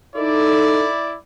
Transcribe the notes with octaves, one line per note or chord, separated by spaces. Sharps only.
D#4 E4 A4 D5